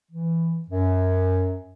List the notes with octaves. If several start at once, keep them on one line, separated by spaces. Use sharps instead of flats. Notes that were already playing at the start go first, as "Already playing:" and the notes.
E3
F#2